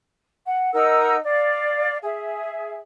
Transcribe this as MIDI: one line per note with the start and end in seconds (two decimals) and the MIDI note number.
0.46 0.73 78
0.73 1.17 63
0.73 1.17 70
0.73 1.17 78
0.73 1.17 88
1.24 1.97 74
1.24 1.97 77
2.02 2.78 68
2.02 2.78 76